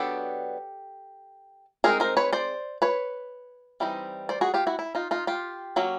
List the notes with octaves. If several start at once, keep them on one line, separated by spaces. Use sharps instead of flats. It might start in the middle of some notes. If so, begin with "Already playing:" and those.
Already playing: F#3 B3 D4 G4 A4
G#3 C4 D#4 G#4 A#4
A#4 C5
B4 C#5
C5 D5
B4 C#5
E3 G3 C4 D#4
C5 D5
F#4 G#4
F4 G4
E4 F#4
E4
D#4 F4
D#4 F4
F4 G4
F#3 A#3 C#4